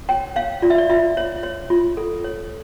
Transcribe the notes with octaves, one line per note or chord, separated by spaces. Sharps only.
C#5 G5
C#5 F5
F4 D5
E5
D5
F4 E5
C#5
C#5
F4
A4
C#5